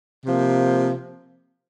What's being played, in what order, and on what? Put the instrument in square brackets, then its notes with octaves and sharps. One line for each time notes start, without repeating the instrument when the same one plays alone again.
[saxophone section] C3 F3 A#3